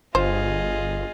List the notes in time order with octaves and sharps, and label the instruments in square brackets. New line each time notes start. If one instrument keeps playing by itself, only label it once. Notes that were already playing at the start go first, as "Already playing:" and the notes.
[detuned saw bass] G1 [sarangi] F4 [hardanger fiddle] G#4 D#5 [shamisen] C5